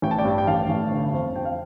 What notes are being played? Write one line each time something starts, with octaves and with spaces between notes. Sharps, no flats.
A1 G5
A5
D5 G5
G2
G5
A1 F5 A5
A1
G1
F2
F2 G5
F5